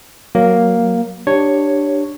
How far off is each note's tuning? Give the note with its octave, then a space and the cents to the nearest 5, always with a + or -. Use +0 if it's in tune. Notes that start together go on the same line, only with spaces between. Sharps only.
F#3 +0 A#3 +0
D4 +10 G4 +0 C#5 +0